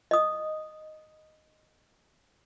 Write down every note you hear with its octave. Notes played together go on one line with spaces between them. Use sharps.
D#5 D#6